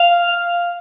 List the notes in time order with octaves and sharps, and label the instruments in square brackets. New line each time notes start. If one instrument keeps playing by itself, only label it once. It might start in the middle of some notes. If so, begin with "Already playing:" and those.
Already playing: [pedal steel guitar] F5